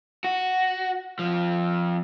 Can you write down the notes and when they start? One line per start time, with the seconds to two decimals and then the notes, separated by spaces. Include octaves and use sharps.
0.24 F#4
1.19 F2 F3